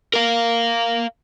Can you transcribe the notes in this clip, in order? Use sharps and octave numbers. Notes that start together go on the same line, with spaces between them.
A#4 F5